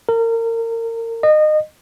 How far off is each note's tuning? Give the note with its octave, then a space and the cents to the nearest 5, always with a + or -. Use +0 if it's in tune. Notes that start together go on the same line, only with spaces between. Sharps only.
A#4 -30
D#5 -25